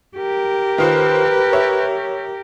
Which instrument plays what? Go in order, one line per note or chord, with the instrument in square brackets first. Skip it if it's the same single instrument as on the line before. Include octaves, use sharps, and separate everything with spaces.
[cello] G4 A#4
[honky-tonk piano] D#3 F4 C5 [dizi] B4
[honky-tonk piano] C#5 E5